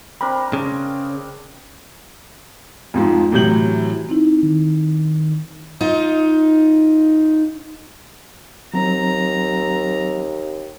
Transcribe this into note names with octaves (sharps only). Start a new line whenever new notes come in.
C4 D4 A#4 B5
C#3 D5
F2 G#2 F3
A2 C3 E3 F#3 G6 F#7
C4 D#4 E4
D#3
D#4 F4
D#2 F#3 C4 A#5